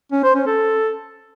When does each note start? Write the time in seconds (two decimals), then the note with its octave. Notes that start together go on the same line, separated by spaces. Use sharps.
0.12 C#4
0.24 C5
0.35 C#4
0.47 A4